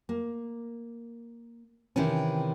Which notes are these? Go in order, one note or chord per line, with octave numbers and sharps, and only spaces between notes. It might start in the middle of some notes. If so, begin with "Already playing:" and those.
A#3
C3 D#3 E3 C#4